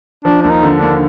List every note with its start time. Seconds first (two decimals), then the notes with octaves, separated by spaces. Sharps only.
0.24 F3 D4
0.42 D#2 D4
0.50 D#4
0.63 D3
0.76 D4
0.82 D#2